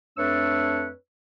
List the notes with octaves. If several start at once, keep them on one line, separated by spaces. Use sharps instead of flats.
F2 A3 D4 B4 C#5 E6